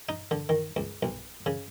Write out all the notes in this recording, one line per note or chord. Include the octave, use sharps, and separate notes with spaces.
D#4
D3
D#3
C#2
B1
C#3